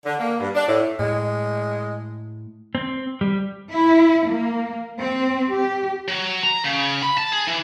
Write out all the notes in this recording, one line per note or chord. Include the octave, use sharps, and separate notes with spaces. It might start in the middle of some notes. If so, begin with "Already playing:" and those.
D3
A#3
G2
D4
A2
A2 G#3
C4
G3
E4
A#3
C4
G4
F#3
A#5
C#3
B5
A5
G#4
E3